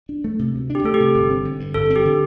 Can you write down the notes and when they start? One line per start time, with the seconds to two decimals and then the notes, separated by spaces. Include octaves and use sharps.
0.09 D4
0.24 A3
0.39 C3
0.55 D2
0.70 D4
0.75 G4
0.84 A3 A4
0.94 G4
1.00 C3
1.14 G1
1.30 C4
1.45 D3
1.60 G2
1.74 G1 A4
1.90 C4
1.96 G4
2.05 D3